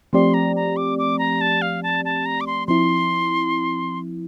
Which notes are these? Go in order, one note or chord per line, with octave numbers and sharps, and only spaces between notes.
F3 A3 C4 G4 D5 C6
A#5
A#5
D6
D6
A#5
A5
F5
A5
A5
A#5
D6
C6
F3 C4 E4 C6